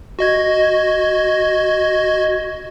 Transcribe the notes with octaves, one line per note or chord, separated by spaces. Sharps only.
F#4 D#5 G#6